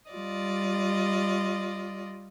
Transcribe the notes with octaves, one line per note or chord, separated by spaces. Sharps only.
G3 F4 D5 D#5